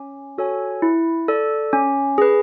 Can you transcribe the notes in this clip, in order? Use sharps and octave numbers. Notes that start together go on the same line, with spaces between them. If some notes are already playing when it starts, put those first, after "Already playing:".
Already playing: C#4
F#4 A4 C#5 G#5
E4
A4 D5
C#4
G#4 B4